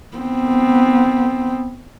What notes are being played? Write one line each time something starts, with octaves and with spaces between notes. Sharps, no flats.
B3 C4